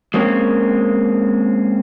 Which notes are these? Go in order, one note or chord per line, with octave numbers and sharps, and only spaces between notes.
G#3 A#3 C4 C#4